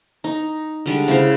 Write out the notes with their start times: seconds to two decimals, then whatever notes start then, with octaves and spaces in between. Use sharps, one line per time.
0.24 D#4
0.86 D3 G3 G#3
1.08 C#3 E4 C5